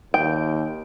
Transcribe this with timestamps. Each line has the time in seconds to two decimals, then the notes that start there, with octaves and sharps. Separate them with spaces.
0.14 D#2 G5